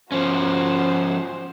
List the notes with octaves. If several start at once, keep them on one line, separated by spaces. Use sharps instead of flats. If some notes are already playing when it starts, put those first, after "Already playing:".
F3 C#4 F#4 C5